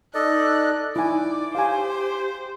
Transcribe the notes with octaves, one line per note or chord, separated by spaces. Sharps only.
D#4 A4 D5 D#5 F#6
D#4 E4 D5 G#5 D6
G4 C5 F5 G#5